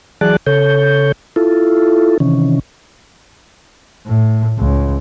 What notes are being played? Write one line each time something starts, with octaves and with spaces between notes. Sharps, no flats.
E3 F#3 G#4 D5 A5 F#6
C#3 A4 C#5 G6
E4 F4 A4
C3 D#3 E3 C#4
A2
C#2